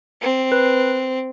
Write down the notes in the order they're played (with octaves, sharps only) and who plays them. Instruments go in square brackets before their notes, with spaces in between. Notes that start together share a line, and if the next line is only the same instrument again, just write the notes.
[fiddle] C4
[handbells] B4